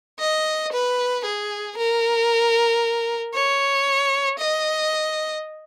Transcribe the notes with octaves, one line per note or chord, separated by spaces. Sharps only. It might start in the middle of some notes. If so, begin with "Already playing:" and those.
D#5
B4
G#4
A#4
C#5
D#5